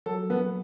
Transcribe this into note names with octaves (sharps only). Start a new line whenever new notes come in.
F#3 A4
B3